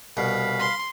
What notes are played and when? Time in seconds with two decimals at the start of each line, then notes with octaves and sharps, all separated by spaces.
0.17 C2 B2 F5 B5
0.58 C6